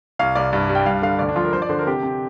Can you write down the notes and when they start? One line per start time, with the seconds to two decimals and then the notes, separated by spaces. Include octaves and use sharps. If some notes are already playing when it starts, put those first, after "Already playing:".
0.19 C2 F5
0.35 C2 D5
0.53 G2
0.69 G3
0.75 G5
0.86 G2 F5
1.02 D3 F5
1.19 D2 D5
1.29 D4
1.36 F3 F4
1.45 A#4
1.52 F3 C5
1.62 D5
1.69 D3 C5
1.79 A#4
1.87 C3 G4
2.03 C3